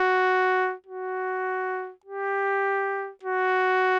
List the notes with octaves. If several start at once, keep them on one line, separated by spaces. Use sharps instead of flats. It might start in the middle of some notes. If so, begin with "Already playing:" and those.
Already playing: F#4
F#4
G4
F#4